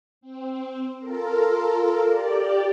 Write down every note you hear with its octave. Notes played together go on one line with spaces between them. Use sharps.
C4
F4 A4 A#4
G4 D5